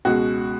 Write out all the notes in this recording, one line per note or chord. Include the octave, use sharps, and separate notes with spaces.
C#2 B2 G#3 F#4